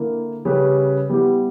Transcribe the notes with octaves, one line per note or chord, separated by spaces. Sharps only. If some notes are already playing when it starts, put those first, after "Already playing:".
Already playing: D3 A#3 E4 A#4
C#3 G3 C#4 G4 B4
G3 B3 E4 G4